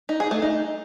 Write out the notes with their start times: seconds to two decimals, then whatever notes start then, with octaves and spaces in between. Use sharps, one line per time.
0.09 D#4
0.20 G#4
0.31 A3
0.42 D#4